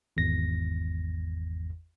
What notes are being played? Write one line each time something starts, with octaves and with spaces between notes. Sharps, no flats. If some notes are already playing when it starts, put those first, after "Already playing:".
G#1 E2 A#6